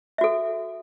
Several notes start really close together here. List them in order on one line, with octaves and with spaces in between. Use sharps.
E5 F#4 A4